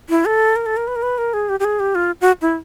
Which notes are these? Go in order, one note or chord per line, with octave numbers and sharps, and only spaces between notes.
E4
A4
A#4
A4
A#4
B4
A#4
B4
A#4
G#4
G4
G4
G#4
G4
F4
F#4
E4